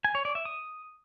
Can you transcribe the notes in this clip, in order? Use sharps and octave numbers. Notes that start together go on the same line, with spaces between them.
G#5
C#5
D5
E5
D#6